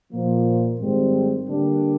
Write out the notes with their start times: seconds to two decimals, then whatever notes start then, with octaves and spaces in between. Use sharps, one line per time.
0.13 A#2 F3 A#3
0.80 G#2 D#3 G3 C4
1.48 D3 G3 A#3 D4